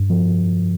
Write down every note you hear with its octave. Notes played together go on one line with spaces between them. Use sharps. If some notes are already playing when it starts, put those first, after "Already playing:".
Already playing: G2
F3